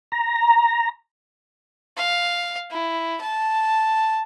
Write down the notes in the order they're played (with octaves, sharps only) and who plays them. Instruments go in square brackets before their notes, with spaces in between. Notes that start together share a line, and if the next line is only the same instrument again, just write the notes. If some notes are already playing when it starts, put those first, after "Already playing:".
[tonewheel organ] A#5
[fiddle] F5
E4
A5